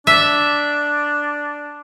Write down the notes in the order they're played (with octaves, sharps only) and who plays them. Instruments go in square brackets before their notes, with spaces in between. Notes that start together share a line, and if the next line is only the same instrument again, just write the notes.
[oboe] D4 [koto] E5